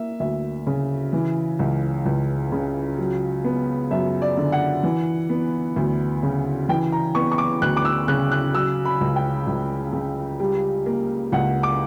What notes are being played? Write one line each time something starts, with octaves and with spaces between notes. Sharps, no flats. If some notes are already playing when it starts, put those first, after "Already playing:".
Already playing: A#3 E5
D2 E5
C#3
E3
C#2
C#2
C#3
F#3
B3
F#2 E5
D5
D3
F#5
E3
B3
D2
C#3
E3 G5
A#5
B3 C#6
C#6
D6
D2 F#6
D6
E6
C#3 F#6
F#6
F#3 E6
B5
C#2
G5
C#2
C#3
G3
A#3
C#2 F#5
D6